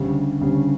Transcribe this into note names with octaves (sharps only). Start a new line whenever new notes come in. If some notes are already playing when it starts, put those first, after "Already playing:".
Already playing: D2 C#3 G3
D2 C#3 G3